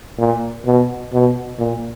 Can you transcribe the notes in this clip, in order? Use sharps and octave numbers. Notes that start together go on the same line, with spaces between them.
A#2
B2
B2
A#2